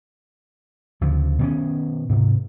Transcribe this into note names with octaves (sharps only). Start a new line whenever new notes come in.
D2 C#3 F3
B2 D#3 C#4
G#2 C3